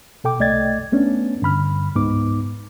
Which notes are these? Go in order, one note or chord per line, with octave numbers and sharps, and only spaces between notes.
B2 A4 G5 D6
C2 A3 D5 D#5 G#6 A6
A3 B3 C#4 D4
G2 D3 B5 F6
C#2 G#2 B3 D#4 D6